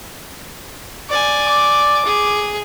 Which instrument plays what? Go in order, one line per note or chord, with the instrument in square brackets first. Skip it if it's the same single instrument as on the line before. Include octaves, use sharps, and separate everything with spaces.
[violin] D5 G#5
[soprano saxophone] D6
[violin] G#4